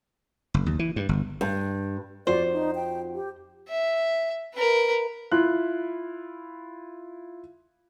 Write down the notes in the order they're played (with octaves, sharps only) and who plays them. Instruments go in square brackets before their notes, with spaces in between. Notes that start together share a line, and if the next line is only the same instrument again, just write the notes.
[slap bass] F#1
D#2
E3
G2
G1
[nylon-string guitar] G2
[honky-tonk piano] F2 F#4 [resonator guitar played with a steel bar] C5 [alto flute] D5
[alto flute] D#4
G5
G4
[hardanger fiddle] E5
A#4 B4
[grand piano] E4 F4 F#6